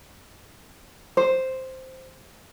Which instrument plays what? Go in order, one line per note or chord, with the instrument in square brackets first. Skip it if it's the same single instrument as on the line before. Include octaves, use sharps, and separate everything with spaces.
[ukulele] C5